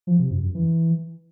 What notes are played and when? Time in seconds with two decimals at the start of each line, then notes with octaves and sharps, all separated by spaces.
0.07 F3
0.19 C3
0.31 F#2
0.43 F#2
0.55 E3